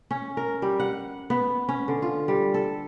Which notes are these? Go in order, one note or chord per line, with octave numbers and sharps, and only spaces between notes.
C#4
A#4
G3
F#5
B3
C#4
D3
F4
G3
A4